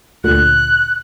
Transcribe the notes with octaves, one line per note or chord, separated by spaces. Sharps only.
D2 A#2 D3 F#6